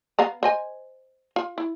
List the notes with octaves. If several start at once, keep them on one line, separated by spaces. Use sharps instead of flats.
B3 F5 A#5
C5 D#5 G#5
F4
E4